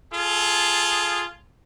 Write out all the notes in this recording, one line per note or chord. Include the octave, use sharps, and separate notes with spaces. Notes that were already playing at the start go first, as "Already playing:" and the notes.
F4 G#4 A4